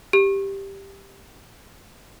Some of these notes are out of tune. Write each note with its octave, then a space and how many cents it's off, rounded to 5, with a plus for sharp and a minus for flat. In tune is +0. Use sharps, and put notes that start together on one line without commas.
G4 +0